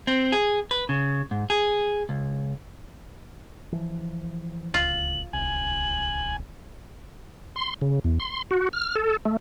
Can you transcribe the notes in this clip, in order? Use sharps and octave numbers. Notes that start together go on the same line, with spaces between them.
C4
G#4
B4
C#3
G#2
G#4
C#2
E3 F3
D1 C#2 F4 F#7
D1 C2 G#5 F#7
C6
C#3
E2
C6
F#4
F6
A4
A3